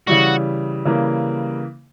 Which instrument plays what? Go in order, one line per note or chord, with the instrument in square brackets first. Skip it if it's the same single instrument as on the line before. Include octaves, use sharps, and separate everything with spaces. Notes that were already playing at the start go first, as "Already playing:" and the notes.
[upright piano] C#3 E3 G3 [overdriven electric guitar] F#4
[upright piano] C#3 E3 G3 A#3